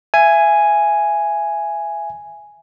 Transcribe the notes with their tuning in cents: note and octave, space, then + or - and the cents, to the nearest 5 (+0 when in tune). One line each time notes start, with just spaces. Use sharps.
E5 +30 G#5 +0